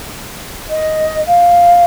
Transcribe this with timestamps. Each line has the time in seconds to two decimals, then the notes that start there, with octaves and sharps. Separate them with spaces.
0.70 D#5
1.27 F5